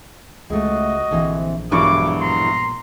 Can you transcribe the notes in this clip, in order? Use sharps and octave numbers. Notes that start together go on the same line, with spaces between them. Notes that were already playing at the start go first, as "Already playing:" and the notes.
C#2 G#3 A3 F#4 D#5
A#1 D3 E3 C4
E1 G2 E3 F#3 E4 C#6 D6
A#5 C6